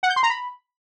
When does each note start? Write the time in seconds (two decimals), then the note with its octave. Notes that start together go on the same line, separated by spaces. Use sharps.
0.03 F#5
0.10 G6
0.16 C6
0.23 A#5
0.30 B5